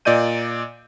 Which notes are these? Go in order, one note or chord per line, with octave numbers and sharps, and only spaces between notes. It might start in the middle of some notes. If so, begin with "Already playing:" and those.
A#2 D5 D#5 G6 D#7